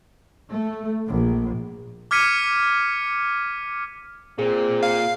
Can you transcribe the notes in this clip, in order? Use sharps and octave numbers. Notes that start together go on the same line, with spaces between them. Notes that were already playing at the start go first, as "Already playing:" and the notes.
A3
A#1
D6 F6 G#6 B6 C#7 D#7
A#2 C4 G#4
F5